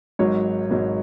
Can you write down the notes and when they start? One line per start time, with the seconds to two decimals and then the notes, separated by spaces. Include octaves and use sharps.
0.19 G#1 G#2 F#3 C#5
0.70 G#1 G#2 F#3